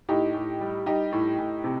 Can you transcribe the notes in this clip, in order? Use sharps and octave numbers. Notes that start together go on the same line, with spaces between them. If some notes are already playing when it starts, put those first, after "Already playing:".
A2 D#4 G4
A2
G3
G3 D#4 G4
A2
A2
C3